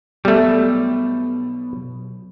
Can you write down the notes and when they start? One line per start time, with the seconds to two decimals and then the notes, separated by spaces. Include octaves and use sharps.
0.25 B1 B2 G3 A3